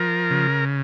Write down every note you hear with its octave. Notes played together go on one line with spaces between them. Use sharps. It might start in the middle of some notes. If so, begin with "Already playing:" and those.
Already playing: F3 A#4
C#3